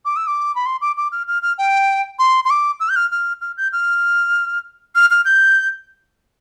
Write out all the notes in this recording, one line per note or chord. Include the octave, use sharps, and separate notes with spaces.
D6
E6
D6
B5
C6
D6
D6
F6
F6
F6
G5
C6
C6
D6
E6
G6
F6
F6
F6
G6
F6
F6
F6
G6